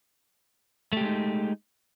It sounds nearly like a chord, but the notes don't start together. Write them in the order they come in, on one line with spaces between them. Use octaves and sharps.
A3 G4 G#3 D#4